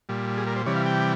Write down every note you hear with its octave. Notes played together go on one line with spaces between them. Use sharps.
A#2 G3
G#4
A#4
C5
C3 E3 G3 C#5
F5
G5